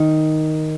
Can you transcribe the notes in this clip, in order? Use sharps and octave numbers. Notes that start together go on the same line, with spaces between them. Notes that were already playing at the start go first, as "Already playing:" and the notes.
Already playing: D#3